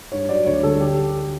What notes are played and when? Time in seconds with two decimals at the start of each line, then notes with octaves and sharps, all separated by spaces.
0.12 G2 C#5
0.29 F#3 D5
0.46 D2 C#5
0.63 D3 G3 A4
0.80 G4